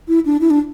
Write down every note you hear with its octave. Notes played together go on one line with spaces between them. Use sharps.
E4
D4
E4
D4